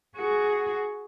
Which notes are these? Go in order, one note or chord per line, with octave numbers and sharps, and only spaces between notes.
F#4 G#4